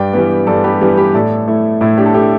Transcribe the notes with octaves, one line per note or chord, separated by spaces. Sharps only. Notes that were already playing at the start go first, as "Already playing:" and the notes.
Already playing: G2 D5 G5
E3 G3 B3
G2 A4 D5
G4 B4
E3 G3 B3
G4 B4
A2 A4 D5
A3 E4
A2 E4
D4 G4
A4
A3 D4 G4